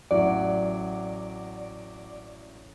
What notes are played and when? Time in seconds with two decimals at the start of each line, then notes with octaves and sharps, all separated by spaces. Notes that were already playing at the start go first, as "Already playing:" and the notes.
0.11 A1 F#3 D5 F#5